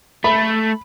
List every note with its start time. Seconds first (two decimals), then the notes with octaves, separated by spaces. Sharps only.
0.24 A3 B5